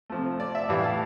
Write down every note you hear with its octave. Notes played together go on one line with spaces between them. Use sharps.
C3 F3 A3
D5
E5
A2 E3 G3 F5
A5